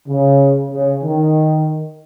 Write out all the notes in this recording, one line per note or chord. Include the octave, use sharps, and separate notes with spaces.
C#3
C#3
D#3